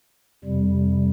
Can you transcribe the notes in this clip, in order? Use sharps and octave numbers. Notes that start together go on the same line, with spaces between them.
F2 C3 G3